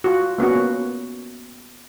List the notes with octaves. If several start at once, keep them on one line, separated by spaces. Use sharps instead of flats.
F4 F#4
A#3 B3 C#4 F#4